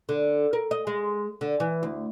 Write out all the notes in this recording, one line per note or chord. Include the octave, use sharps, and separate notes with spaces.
D3
A#4
D#5
G#3
D3
E3
D2